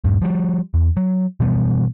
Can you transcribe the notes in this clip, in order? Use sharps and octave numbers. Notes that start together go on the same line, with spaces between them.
D#1 G2
F3 G3
E2
F#3
B2 E3 G3 B3